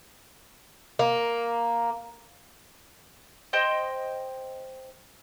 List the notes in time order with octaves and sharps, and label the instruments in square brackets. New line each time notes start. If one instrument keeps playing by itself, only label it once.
[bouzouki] A#3
[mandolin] C5 D#5 G5